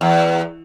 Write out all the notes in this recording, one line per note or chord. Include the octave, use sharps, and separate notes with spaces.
E2